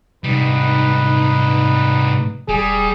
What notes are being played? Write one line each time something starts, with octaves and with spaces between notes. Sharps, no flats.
G#2 C3 G3 D#4 B4
E1 G3 G#4